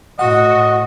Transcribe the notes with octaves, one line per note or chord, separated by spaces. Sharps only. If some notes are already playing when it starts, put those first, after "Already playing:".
A2 F#4 D#5 F#5